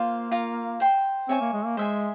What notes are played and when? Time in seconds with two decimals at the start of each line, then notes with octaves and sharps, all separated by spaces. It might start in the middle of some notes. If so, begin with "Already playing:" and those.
Already playing: A#3 F4 C5 F5
0.31 F4 A#4 F5 A#5
0.80 C5 G5 C6
1.29 C4 C#5 E5 G#5 C#6
1.41 A#3
1.53 G#3
1.65 A#3
1.77 G#3 C5 E5 G#5